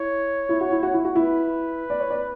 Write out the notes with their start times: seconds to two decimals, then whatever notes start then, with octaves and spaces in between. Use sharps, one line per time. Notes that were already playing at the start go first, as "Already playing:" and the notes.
Already playing: E4 C#5
0.49 E4
0.61 F#4
0.71 E4
0.83 F#4
0.93 E4
1.05 F#4
1.15 E4 B4
1.90 D5
2.00 C#5
2.11 D5